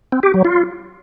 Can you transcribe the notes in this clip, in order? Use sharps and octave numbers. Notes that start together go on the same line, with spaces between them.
C4
G4
F#3
F4